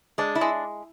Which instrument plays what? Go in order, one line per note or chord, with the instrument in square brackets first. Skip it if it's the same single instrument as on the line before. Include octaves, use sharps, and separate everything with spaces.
[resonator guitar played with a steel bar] G#3 [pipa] D4
[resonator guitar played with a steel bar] E4
[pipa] G#3